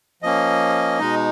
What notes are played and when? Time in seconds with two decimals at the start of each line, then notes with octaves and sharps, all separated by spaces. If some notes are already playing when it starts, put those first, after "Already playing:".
0.22 F3 A#3 C#4 D#5
0.99 B2 G#3 D#4